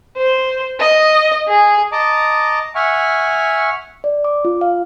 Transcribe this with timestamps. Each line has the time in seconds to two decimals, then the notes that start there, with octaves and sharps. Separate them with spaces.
0.17 C5
0.80 D#5
1.48 G#4
1.92 D#5 A5 A#5 D6
2.75 E5 F#5 G#5 C#6 F6
4.04 D5
4.24 D6
4.45 F4
4.61 F5